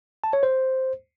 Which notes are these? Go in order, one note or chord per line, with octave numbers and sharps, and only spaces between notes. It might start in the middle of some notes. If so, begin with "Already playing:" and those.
A5
C#5
C5